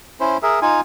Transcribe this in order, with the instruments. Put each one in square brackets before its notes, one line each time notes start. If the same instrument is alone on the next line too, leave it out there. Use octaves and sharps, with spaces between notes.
[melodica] C#4 E4 C5
G#4 A#4 E5
D#4 F4 G#5